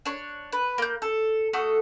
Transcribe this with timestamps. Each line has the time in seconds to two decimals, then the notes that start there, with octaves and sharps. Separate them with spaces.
0.06 D4 C#5
0.52 B4
0.78 A#3 G6
1.02 A4
1.53 A3 F#4 A4 D#6